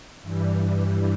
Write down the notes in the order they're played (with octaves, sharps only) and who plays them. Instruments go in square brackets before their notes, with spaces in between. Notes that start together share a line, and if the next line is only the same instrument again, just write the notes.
[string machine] G2 E3 G3